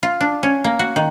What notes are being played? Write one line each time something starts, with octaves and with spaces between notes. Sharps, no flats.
F4
D4
C#4
A#3
F#4
D#3